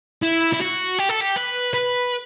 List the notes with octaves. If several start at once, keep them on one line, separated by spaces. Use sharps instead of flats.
E4
E4
F#4
G4
A4
G4
B4
B4